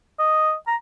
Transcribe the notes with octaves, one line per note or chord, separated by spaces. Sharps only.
D#5
A#5